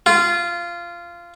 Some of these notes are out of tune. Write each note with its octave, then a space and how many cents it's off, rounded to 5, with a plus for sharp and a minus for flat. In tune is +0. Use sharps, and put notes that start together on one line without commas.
F4 -15